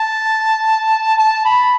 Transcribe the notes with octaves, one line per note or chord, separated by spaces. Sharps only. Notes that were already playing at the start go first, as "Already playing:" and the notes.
Already playing: A5
A5
B5